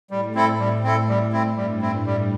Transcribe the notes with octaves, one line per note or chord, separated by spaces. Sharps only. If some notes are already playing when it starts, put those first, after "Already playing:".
A2 G3
C4 E4 A4
G3
C4 E4 A4
A2 G3
C4 E4
G2 G3
C4 E4
G3